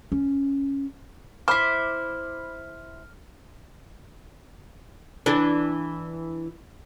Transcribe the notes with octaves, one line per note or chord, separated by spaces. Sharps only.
C#4
E4 C5 B5 D6 F6
E3 D4